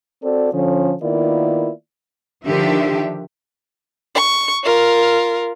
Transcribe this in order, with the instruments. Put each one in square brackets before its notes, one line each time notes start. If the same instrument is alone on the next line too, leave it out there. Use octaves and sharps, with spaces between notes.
[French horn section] C4 F#4 A4 D5
D3 F3 C#4
D#3 A#3 B3 E4 F4 D5
[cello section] D3 D#3 F3 D4 G4 E5
[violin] C#6
F4 A#4